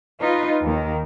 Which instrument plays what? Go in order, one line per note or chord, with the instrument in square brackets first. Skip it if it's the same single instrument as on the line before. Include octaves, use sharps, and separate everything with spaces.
[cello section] D#4 F4 B4
D#2 D#3